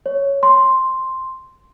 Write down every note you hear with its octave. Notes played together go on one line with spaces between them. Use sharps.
C#5
C6